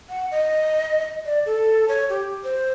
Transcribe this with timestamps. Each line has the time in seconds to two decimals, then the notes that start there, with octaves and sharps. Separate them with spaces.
0.09 F#5
0.31 D#5
1.25 D5
1.46 A4
1.88 C#5
2.10 G4
2.44 C5